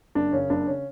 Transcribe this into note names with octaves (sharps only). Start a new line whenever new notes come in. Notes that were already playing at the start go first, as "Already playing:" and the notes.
F#1 D4
F#2 C#3 C#4
F#1 D4
C#3 C#4